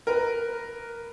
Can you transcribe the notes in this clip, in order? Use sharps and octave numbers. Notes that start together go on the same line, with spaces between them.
A#4 B4